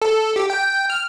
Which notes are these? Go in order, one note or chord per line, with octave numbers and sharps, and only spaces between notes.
A4
G4
G5
F6